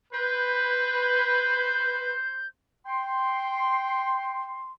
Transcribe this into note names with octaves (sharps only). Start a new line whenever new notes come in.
B4 C5 G6
G5 C6